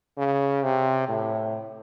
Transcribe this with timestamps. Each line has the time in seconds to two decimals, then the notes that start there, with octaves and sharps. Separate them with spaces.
0.17 C#3
0.64 C3
1.08 A2